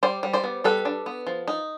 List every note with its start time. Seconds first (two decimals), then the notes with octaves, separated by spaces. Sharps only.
0.03 G3 C5 D5
0.23 G3
0.33 C5 D5
0.44 B3
0.64 G3 A4 B4
0.85 D4
1.06 B3
1.27 F3
1.48 D#4